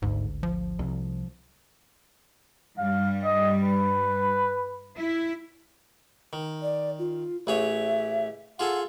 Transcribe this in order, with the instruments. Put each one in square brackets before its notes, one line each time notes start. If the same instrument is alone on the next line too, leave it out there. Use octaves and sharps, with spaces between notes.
[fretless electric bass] G#1 D2 [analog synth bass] G#2
[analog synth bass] F3
[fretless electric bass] C2
[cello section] G2 G3 [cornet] F5
[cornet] D#5
B4
[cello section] E4
[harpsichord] D#3
[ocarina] D5
F4
[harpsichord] A1 G#4 C#5 [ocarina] E5
[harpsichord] F4 G#4 A4 [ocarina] F#5